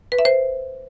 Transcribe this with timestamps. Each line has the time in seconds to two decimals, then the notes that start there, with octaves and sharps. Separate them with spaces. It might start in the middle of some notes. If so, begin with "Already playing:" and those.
0.12 B4
0.19 E5
0.25 C5